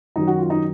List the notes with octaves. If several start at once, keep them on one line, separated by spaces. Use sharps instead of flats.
F#2 D#3 F#3 D#4
F#4
F4
D#4